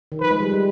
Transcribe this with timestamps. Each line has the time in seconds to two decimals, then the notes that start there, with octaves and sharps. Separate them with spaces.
0.12 D#3
0.21 F3 B4
0.31 G#3
0.40 G3
0.52 G3